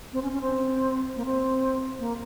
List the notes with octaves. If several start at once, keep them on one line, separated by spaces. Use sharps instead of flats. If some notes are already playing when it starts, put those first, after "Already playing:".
C4
C#4
C#4
C4
A#3
C4
A#3